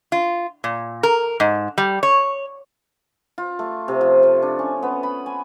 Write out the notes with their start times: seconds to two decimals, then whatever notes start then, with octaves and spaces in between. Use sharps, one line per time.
0.12 F4
0.64 A#2
1.03 A#4
1.40 G#2
1.78 G3
2.03 C#5
3.38 F4
3.59 A3
3.88 C3
4.01 F3
4.23 A3
4.42 D4
4.59 C#4
4.83 B3
5.03 B5
5.26 G#5